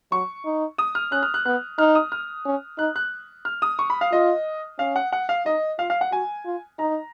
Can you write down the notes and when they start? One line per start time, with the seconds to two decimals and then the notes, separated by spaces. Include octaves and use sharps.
0.12 F#3 C#6
0.45 D#4
0.78 D#6
0.95 F6
1.12 C#4 F#6
1.23 F6
1.34 F#6
1.46 B3 F#6
1.78 D#4 F6
1.95 D#6
2.12 F6
2.45 C#4
2.78 D#4 F#6
2.96 F#6
3.45 F6
3.62 D#6
3.79 C#6
3.90 B5
4.01 F5
4.12 F4 D#5
4.79 C#4 F5
4.96 F#5
5.12 F#5
5.29 F5
5.46 D#4 D#5
5.79 F4 F5
5.90 F5
6.01 F#5
6.12 F#4 G#5
6.45 F4
6.79 D#4 A#5